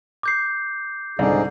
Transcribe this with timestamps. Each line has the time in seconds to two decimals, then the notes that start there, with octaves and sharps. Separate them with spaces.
0.23 D6 G6 C7
1.19 C2 G#2 D3 D#4 G#4 D5